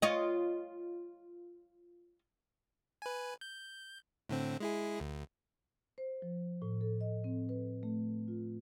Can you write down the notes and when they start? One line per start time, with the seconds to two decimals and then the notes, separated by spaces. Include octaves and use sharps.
0.02 F4 C#5 D#5
3.02 B4 G#5
3.41 G6
4.29 A2 D3 C4
4.60 G#3 E4 G#4
5.00 D2
5.98 C5
6.22 F3
6.62 A2
6.81 A4
7.01 D#5
7.24 C4
7.49 B4
7.83 A3
8.28 F4